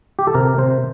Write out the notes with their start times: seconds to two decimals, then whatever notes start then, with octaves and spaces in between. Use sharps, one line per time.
0.19 G4
0.27 A4
0.34 C3 A#4
0.58 C3 C5